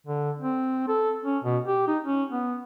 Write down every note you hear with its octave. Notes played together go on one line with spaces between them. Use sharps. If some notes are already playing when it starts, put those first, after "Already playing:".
D3
C4
A4
C#4
B2
G4
D#4
C#4
B3